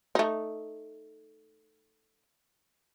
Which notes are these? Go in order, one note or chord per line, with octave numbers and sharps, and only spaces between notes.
A3 D#4